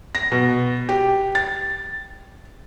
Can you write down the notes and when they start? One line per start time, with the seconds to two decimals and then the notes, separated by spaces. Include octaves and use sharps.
0.15 A#6
0.32 B2
0.89 G4
1.35 A6